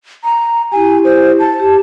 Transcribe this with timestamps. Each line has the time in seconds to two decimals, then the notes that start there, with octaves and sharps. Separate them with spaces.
0.24 A#5
0.72 E4 G4 G#5
1.04 C5
1.39 A5
1.60 G4